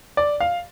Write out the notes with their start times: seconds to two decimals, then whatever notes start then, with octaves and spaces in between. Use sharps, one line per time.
0.17 D5
0.40 F5